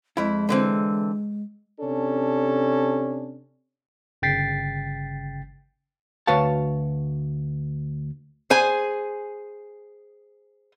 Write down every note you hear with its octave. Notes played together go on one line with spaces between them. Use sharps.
F2 G#3 E4
D3 E3 C4
C3 C#4 D4 A4
G1 C#3 G5 A6 B6 C7
D2 F#4 B4 C#5 F5 A5
G#4 C5 G#5